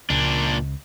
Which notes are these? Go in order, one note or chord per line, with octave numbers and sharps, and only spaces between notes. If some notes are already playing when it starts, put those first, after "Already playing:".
C#2 A#2 D4